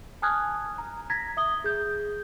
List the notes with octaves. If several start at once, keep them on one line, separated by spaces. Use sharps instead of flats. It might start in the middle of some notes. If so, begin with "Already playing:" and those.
G#5 A5 D#6 F6 F#6 G#6
A#5
A#5 G#6 A#6 B6
E5 D#6 G7
G#4 G6